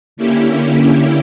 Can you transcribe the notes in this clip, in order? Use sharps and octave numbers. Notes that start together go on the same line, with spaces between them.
D3 A#3 C#4 E4 G4